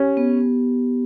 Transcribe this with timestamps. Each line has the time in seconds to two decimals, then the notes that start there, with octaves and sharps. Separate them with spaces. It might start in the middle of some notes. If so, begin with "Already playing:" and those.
Already playing: C#4 G4
0.17 B3